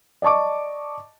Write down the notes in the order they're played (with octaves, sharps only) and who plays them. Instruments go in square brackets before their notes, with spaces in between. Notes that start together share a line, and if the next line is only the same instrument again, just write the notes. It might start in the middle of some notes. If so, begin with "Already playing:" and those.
[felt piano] D5 D#5 A5 C#6 D6